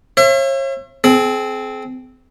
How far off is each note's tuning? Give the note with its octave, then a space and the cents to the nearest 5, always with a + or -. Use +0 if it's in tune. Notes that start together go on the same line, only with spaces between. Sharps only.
C#5 -40 E5 +40
C4 -10 G#4 +35